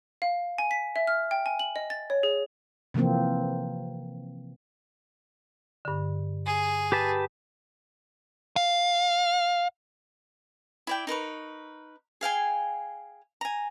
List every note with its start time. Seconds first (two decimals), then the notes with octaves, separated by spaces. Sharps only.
0.22 F5
0.58 G#5
0.71 B6
0.96 E5
1.07 F6
1.31 G5
1.46 G#5
1.59 F#7
1.76 D#5
1.90 A6
2.10 C#5
2.23 G#4
2.94 C3 E3 F3 A#3 C4
5.85 G2 D3
6.46 G#4
6.92 G4 B4 A5
8.56 F5
10.87 E4 D5 G5
11.07 D#4 A#4 B4 C#6
12.21 G#4 F5 G5 G#5
13.41 G#5 A#5